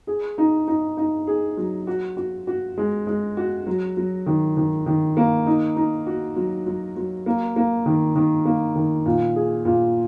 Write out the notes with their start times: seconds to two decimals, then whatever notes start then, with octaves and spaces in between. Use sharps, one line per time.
0.07 G#4
0.38 D#4
0.68 D#4
0.97 D#4
1.27 G#4
1.57 F#3
1.87 F#4
2.17 F#4
2.47 F#4
2.78 G#3
3.07 G#3
3.37 F#4
3.67 F#3
3.97 F#3
4.26 D#3
4.57 D#3
4.86 D#3
5.17 A#3
5.46 D#4
5.76 D#4
6.06 F#4
6.36 F#3
6.66 F#3
6.96 F#3
7.26 A#3
7.56 A#3
7.86 D#3
8.16 D#3
8.45 A#3
8.75 D#3
9.06 A#2
9.36 G#4
9.65 A#2